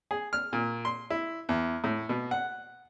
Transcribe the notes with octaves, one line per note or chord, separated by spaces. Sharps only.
G#4
F6
A#2
C6
E4
E2
A2
B2
F#5